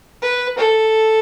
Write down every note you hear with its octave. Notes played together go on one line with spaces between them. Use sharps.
B4
A4